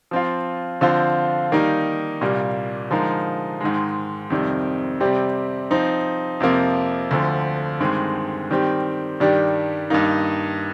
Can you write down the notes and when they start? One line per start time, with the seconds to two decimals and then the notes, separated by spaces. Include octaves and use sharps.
0.11 F3 C4 F4
0.81 D3 F3 C4 F4 C5
1.52 D#3 G3 A#3 D#4
2.21 C2 A#2 G3 A#3
2.90 D3 F3 G#3 D#4 A#4
3.61 G#2 D#3 G#3
4.30 F2 C3 D#3 G3
5.00 C3 G3 C4 G4
5.70 F3 C4 D#4
6.40 F2 C3 F3 A#3
7.11 D2 D3 F3
7.80 G2 D#3 G#3 C4
8.51 D#3 G3 C4 G4
9.20 G2 D#3 G3 D4 G4
9.90 G2 D#3 A#3 D#4